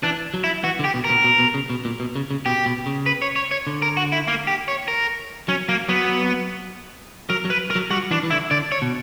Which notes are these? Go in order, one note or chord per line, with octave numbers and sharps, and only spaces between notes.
E3 D4
F#3
E4
E3 F#4
D3
G4
B2
A#4
B2
B2
B2
C#3
B2
A#2
B2
C#3
C#3
B2 G4
B2
C#3
B4
C#5
C#5
C#5
D3
A#4
F#4
E4
A#3
G4
C#5
A#4
F#3 C#4
F#3 A#3
F#3 B3
F#3 A#4
F#3
B4
A#4
F#3
G3 F#4
E3 D4
E3
D3 E4
D3 D5
C#5
B2